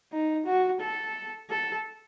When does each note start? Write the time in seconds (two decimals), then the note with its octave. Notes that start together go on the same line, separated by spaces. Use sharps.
0.12 D#4
0.46 F#4
0.80 A4
1.50 A4